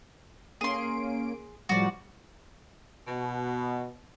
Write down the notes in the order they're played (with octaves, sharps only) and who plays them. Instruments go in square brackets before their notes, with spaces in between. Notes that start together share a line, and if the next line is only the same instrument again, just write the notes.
[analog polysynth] A#3 C#4 D7 [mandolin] G#4 C6
[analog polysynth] A2 F3 G3 [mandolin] F#4 D5
[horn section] B2